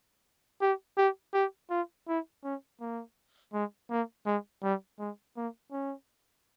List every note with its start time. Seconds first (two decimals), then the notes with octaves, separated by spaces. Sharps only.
0.61 G4
0.97 G4
1.34 G4
1.70 F4
2.08 E4
2.44 C#4
2.80 A#3
3.53 G#3
3.90 A#3
4.26 G#3
4.63 G3
4.99 G#3
5.36 A#3
5.72 C#4